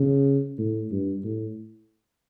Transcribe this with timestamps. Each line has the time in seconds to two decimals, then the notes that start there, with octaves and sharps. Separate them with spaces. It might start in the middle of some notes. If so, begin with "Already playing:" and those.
Already playing: C#3
0.58 A2
0.91 G2
1.24 A2